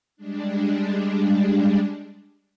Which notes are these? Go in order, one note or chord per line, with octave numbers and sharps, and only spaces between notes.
G3 G#3 D4